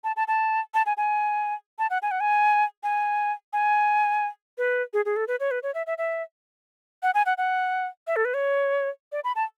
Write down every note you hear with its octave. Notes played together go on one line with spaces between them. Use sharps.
A5
A5
A5
A5
G#5
G#5
A5
F#5
G#5
F#5
G#5
G#5
G#5
B4
G#4
G#4
A4
B4
C#5
B4
C#5
E5
E5
E5
F#5
G#5
F#5
F#5
E5
A4
B4
C#5
D5
B5
A5